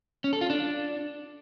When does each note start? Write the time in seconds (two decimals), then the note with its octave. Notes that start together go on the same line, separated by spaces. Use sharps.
0.24 C#4
0.33 A4
0.41 F4
0.50 D4